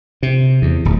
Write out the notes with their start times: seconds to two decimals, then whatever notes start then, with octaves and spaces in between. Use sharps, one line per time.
0.23 C3
0.62 E2
0.85 D1